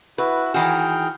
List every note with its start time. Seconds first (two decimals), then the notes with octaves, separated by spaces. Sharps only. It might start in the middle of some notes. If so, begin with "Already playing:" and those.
0.18 E4 F#4 B4
0.54 D#3 E3 F#4 G#4 G5 F6